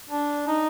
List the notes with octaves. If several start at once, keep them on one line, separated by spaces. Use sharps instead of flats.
D4
D#4